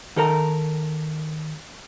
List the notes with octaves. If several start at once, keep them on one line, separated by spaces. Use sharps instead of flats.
D#3 A4 A#4 A#5